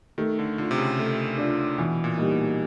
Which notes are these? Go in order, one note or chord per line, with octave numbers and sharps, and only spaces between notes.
D#3 A3
D3
D3 D4 F4
C3
C#3
A3
D4 F4
B2 E3
A#2
G3 A#3 D#4
B2